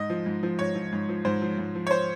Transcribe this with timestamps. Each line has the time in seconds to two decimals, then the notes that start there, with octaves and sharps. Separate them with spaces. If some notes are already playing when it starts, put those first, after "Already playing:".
Already playing: G#2 D#5
0.10 F3
0.26 G#2
0.43 F3
0.59 G#2 C#5
0.75 F3
0.93 G#2
1.09 F3
1.25 G#2 C5
1.42 F3
1.58 G#2
1.75 F3
1.87 C#5
1.91 C5